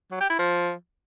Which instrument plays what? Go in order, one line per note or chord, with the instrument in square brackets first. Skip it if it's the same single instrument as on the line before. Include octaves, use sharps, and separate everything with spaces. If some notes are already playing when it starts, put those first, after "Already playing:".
[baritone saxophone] F#3
G4
E4
F3